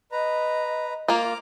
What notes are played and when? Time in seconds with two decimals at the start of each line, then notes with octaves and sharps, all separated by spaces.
0.12 B4 D#5 A#5
1.08 A#3 F4 A#5 D6 F6